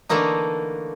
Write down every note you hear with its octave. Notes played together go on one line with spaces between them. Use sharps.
D3 E3 A3 A#3 D#4